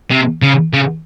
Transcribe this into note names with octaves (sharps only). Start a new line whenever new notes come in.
C3
C#3
C#3